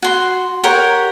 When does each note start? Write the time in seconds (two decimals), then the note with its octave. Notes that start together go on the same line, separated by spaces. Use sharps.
0.02 F#4 C6
0.63 G4 A#4 C#5 F#5